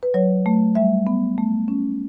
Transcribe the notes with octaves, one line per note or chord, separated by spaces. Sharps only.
B4
F#3 C#5
A3
G3 E5
B3
A3
C#4